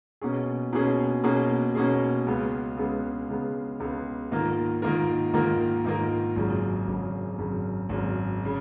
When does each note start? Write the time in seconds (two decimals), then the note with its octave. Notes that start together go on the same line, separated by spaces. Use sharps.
0.21 B2 A#3 C#4 G#4
0.73 B2 A#3 C#4 G#4
1.24 B2 A#3 C#4 G#4
1.75 B2 A#3 C#4 G#4
2.26 C#2 C#3 G#3 B3
2.77 C#2 C#3 G#3 B3
3.29 C#2 C#3 G#3 B3
3.80 C#2 C#3 G#3 B3
4.31 G#2 D#3 A#3 F4 A#4
4.82 G#2 D#3 A#3 F4 A#4
5.33 G#2 D#3 A#3 F4 A#4
5.85 G#2 D#3 A#3 F4 A#4
6.36 G#1 F#2 C#3 G#3
6.87 G#1 F#2 C#3 G#3
7.38 G#1 F#2 C#3 G#3
7.89 G#1 F#2 C#3 G#3
8.45 C#3